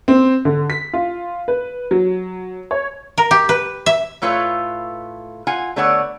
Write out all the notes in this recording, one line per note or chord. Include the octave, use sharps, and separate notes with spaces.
C4
D3
B6
F4
B4
F#3
C#5
A#4
G4
B4
E5
A2 A3 F4 B4 C#5
F4 F#5 G#5
D3 A3 B3 C#5 D5 F#5